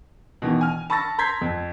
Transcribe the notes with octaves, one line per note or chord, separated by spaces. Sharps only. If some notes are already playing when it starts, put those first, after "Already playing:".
B2 D#3 E3
G#5 F6
A5 B5 C#6 E6 A6 A#6
A#5 C6 G6 G#6 B6 C7
F2